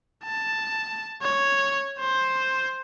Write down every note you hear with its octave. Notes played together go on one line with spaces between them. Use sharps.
A5
C#5
C5